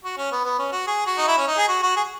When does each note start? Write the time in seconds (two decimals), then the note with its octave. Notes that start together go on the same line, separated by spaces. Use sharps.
0.04 F#4
0.17 C#4
0.32 B3
0.44 B3
0.59 C#4
0.72 F#4
0.87 G#4
1.06 F#4
1.18 D#4
1.27 E4
1.38 C#4
1.47 D#4
1.58 G#4
1.68 F#4
1.82 F#4
1.96 G#4